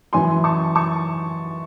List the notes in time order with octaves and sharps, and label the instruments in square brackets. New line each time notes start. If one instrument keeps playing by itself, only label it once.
[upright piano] F#2 E3 G#5 C6
A5 C#6
A5 C#6